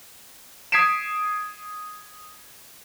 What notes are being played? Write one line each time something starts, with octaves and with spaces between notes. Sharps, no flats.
D#6 G#6 B6 C7 D7 E7